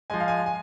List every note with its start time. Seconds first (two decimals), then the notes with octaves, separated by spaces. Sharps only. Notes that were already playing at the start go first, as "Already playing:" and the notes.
0.10 F3 G#3 G#5
0.20 F5
0.28 G#5
0.46 G#5